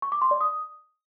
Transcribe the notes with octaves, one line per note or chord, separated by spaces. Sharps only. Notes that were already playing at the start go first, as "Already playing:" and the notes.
C#6
D6
C6
D5
D#6